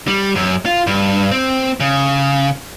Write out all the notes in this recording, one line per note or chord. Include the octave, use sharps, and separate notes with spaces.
G3
F#2
F4
G2
C4
C#3